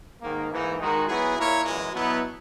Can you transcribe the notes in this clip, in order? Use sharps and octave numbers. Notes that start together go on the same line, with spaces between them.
G#2 D#3 A#3
G#2 E3 A#3 D#4
D#3 G#3 D#4 F#4 A#4
F#3 B3 E4 G#4
A#2 A#3 E4 A#4 C#5
F#2 E3 G#3
B2 F#3 B3 E4